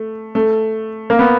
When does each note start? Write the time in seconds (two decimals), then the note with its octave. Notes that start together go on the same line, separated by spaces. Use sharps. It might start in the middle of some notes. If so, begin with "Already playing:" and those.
Already playing: A3
0.35 A3
1.10 A#3
1.19 B3